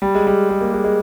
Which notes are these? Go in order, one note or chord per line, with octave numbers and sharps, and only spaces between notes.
G3
G#3
G3
G#3
A#3
G#3
G#3